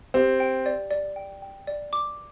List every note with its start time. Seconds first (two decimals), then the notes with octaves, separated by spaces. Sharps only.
0.14 C4 G4
0.40 G5
0.66 D5
0.91 D5
1.16 G5
1.42 G5
1.67 D5
1.93 D6